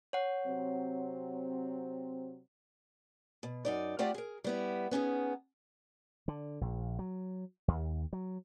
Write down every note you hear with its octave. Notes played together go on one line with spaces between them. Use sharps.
C#5 F#5
C3 F#3 C4
B2
F#2 D#4 D5
A3 C4 F4 G4 D5 F#5
G#4 A#4
G3 B3 E4
B3 C#4 D#4 G#4
D3
A#1
F#3
D#2
F#3